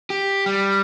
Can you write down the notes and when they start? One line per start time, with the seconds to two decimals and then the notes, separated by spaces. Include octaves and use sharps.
0.10 G4
0.46 G3